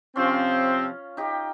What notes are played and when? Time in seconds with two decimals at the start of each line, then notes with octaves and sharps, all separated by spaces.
0.16 C3 F3 C4 C#4 F4
1.17 D#4 G4